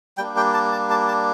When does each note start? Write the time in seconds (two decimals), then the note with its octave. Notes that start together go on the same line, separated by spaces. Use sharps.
0.18 G3 A#3 D4 G5
0.37 G5
0.54 A5
0.72 A5
0.90 A5
1.08 A5